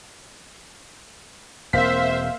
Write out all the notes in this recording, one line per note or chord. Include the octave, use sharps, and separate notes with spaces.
E1 A#3 C4 C5 E5 F5 B6